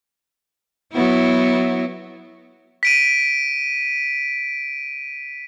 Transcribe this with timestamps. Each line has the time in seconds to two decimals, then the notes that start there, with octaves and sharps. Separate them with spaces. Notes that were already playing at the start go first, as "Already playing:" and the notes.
0.93 F#3 B3 E4
2.83 B6 D7 D#7